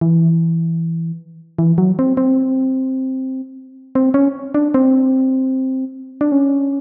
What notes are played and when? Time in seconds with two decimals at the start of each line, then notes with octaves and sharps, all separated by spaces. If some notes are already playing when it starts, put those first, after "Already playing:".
0.01 E3
1.59 E3
1.78 F#3
1.99 C4
2.17 C4
3.95 C4
4.14 C#4
4.54 D4
4.74 C4
6.21 D4
6.32 C#4